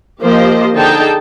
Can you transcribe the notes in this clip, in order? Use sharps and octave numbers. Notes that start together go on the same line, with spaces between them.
F3 A#3 G4 C5 D#5
D3 D#4 G#4 G5 A5